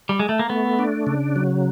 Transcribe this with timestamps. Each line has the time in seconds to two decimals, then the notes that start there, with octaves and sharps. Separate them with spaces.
0.09 G3
0.20 G#3
0.29 A3
0.39 A#3
0.50 A3 B3
0.79 D4
1.07 C#3
1.36 F#3